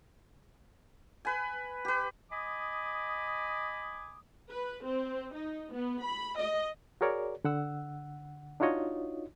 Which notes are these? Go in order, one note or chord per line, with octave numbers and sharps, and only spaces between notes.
B4 G#5
G4 B4
D#5 G#5 B5 D6 D#6
B4
C4
D#4
B3
B5
D#5
F#4 G#4 A#4 C#5 D5
D3 F#5 E6
D4 D#4 F4 F#4 C#5 D#5